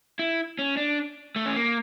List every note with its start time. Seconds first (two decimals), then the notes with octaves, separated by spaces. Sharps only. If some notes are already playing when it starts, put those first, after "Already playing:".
0.19 E4
0.59 C#4
0.77 D4
1.36 A3
1.46 C#4
1.56 A#3